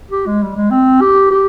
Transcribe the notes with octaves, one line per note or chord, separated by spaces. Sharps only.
G4
G#3
G3
G#3
C4
G4
G4